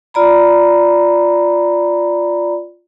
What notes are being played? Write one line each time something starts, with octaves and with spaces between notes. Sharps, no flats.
F4 D5 A#5 B5